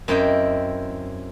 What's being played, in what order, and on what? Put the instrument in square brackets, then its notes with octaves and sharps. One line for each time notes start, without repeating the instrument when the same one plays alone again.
[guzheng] F#2 C4 E4 D#5 G5